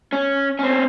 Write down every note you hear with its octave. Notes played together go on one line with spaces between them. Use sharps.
C#4
C4 C#4